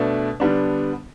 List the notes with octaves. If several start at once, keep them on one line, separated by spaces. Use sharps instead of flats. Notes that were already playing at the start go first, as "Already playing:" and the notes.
Already playing: B2 A3 D4
D3 G3 B3 D4